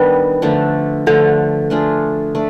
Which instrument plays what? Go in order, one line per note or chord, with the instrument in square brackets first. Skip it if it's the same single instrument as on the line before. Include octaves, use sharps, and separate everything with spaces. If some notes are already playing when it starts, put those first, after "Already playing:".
Already playing: [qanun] D#3 G3 B3 D4 [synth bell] B4
[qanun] D3 F3 A3 D4
[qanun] D3 F3 A3 D4 [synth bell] A4
[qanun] A3 D4 F4 G#4
A3 D4